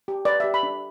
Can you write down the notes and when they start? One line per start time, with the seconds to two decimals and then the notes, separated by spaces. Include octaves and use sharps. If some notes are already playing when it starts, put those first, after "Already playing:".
0.08 G4
0.25 B4 D5
0.40 G4 E5
0.54 B5
0.63 D4